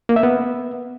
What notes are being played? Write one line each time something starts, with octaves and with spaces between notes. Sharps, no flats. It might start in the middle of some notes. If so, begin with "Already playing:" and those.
A#3
E5
B3